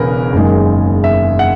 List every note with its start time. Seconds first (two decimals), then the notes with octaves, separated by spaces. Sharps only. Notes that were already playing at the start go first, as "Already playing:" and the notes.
Already playing: E1 E2 C#3 A#4 B4
0.33 F#1 F#2 D#3 G#3
1.04 E5
1.39 F#5